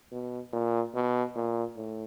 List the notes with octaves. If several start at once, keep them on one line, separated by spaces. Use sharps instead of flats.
B2
A#2
B2
A#2
A2